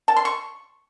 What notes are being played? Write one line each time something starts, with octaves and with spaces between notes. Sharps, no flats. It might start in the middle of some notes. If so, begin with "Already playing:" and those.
A5
C6
C#6